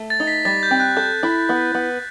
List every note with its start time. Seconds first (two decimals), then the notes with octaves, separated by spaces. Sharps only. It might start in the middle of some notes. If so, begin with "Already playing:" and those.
Already playing: A3
0.10 A6
0.20 D#4
0.27 B6
0.45 G3 A6
0.63 G6
0.71 C4
0.80 F#6
0.97 A4 G6
1.23 E4
1.49 B3
1.74 B3